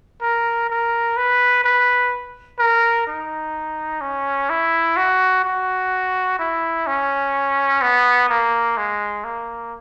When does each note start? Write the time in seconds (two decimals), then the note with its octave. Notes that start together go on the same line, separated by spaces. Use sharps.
0.22 A#4
0.70 A#4
1.17 B4
1.65 B4
2.59 A#4
3.07 D#4
4.01 C#4
4.50 E4
4.97 F#4
5.44 F#4
6.39 E4
6.87 C#4
7.82 B3
8.29 A#3
8.77 G#3
9.24 A#3